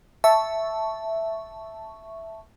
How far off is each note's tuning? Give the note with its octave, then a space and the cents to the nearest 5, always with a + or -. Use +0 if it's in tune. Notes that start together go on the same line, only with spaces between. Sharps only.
E5 +0 A5 +0 C#6 +0